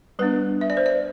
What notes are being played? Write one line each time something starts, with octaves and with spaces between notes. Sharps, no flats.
G3 B3 D4 B4
E5
D5
C5
D5